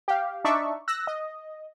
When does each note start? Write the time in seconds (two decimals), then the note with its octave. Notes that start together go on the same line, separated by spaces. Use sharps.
0.08 G4 F5
0.44 D4 D#4 D5 E5 C#6
0.88 E6 F#6 A#6
1.07 D#5